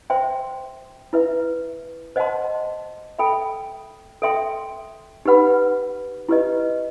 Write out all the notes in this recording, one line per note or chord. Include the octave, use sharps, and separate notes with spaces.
C5 E5 G5 C6
E4 B4 E5
C5 D#5 F#5 A5 C6
A4 E5 G5 B5
A4 E5 G5 C6
D#4 G4 B4 F#5 B5
E4 G4 B4 D#5